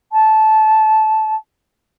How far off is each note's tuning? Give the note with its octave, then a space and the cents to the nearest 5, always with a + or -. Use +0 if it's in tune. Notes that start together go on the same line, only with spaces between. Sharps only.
A5 -15